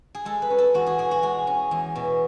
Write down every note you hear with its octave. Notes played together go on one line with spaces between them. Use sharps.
G#4
G#3 A4
B4
C#4
A4
E2 F#4
G#4
B2 G#4
F#4
G#3 G#4
C#4
E2
B2